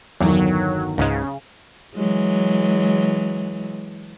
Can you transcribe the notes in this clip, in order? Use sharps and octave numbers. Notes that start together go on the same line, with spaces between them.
G1 E2 D#3 F#3
C#2 G#2 C#3 G#3
E3 F#3 G#3